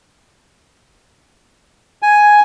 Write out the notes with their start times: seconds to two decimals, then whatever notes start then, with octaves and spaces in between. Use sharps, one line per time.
2.02 G#5